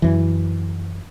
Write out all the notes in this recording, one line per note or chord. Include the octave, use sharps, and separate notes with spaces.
F#2 E3